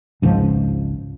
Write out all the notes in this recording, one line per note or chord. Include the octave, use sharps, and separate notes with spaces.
G#1 C#2 G#2 F3